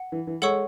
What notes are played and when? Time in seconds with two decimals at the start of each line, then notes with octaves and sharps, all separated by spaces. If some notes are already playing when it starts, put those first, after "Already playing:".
Already playing: F#5
0.12 E3
0.27 E3
0.42 G#3 A4 C#5 F#5 C#6 E6